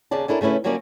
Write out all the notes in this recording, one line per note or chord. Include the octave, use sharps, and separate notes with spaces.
D#2 C#3 D5 A5
C#4 D4 E4 A4 A#4
C#3 A3 C#4 E4 B4
D3 F#3 G3 A#3 C#4 D5